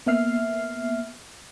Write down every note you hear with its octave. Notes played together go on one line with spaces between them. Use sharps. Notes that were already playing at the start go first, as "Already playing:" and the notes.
A#3 B3 E5 F6 C7